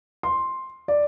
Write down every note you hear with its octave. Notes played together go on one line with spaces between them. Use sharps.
C6
D5